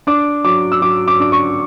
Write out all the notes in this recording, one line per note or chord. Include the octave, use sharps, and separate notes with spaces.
D4 D6
F#3 D6
E6
F#3 D6
D6
D4 D6
C#6